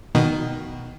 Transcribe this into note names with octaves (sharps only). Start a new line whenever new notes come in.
B2 D#3